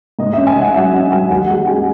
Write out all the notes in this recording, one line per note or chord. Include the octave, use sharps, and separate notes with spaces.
G#2 D#5
C#4 E5
G#5
G#2 F#5
F#3 E5
C#4 F#5
F#3 G#5
D#2 F#5
G#3 F#5
G#3 G#5